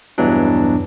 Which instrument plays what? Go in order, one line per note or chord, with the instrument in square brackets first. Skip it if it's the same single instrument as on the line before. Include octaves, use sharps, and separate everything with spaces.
[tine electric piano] E2 G2 B2 E3 F#3 D4